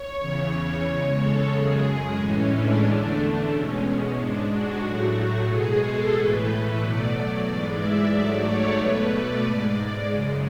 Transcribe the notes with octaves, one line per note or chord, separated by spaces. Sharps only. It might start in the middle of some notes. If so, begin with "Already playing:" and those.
Already playing: C#5
E2 C#3 E3
E2 C#3 G#3 C#5
A4
F#2 C#3 G#3 G#4
A2 E3 G#3 C#4
D4
E2 D3 A3
D4
E2 B2 G#3 C#4
G#2 G#3 D4
F#4
A2 F#3 A3
B2 G#3 G#4
A4
A2 E3 A3 B4
B2 F#3 A3 D5
D5
G#2 E3 G#3
E5
G#2 F#3 A3 D5
C#5
B2 A3 B4
D5
G#2 G#3 D5
F#2 C#3 G#3